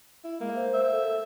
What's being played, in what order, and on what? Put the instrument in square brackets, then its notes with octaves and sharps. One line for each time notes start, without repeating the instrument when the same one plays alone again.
[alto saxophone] E4
[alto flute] G#3 [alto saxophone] A#3
[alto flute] C5
[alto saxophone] E5
[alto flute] A4